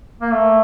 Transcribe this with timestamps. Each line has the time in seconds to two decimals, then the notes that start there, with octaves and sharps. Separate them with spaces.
0.21 A#3
0.33 A3